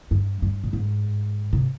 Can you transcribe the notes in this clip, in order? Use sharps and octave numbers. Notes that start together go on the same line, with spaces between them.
G2
G2
A#2
G#2
C3